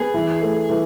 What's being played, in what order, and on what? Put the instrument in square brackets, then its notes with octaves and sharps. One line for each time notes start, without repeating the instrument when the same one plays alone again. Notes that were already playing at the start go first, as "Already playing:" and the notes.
Already playing: [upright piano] B3 [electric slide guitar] G#4
[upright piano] E3
A3
E3